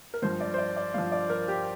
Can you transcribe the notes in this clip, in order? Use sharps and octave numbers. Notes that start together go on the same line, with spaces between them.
A#4
G2 F3 C5
D5
C5
D5
D5
G2 F3 F5
D5
A#4
G4